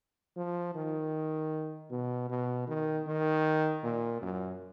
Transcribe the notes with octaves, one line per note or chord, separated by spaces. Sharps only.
F3
D#3
B2
B2
D#3
D#3
A#2
F#2